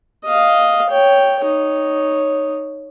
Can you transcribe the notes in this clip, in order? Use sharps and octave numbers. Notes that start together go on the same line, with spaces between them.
D#5 F5
C#5 G5
D#4 C#5